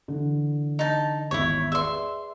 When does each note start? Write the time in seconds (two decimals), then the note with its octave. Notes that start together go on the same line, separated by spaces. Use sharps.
0.08 D3 E3
0.79 D#4 A5
1.31 G#1 E2 E4 C#5 E6
1.72 G#4 B4 D5 E5 C6